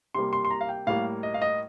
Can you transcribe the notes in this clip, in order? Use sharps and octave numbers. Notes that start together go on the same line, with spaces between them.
C3 G3 A#3 C6
C6
C6
A#5
F5
G5
A2 G3 A#3 F5
D#5
F5
D#5